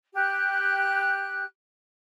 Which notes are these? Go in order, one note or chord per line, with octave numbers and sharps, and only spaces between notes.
G4 F#6